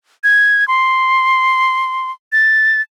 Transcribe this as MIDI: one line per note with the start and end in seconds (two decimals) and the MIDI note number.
0.24 0.67 92
0.68 2.11 84
2.32 2.81 93